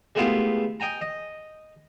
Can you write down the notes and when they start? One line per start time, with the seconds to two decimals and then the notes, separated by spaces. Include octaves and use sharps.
0.15 G#3 A3 B3 E4 F4 G4
0.80 D#5 G5 G#5 A#5
1.01 D#5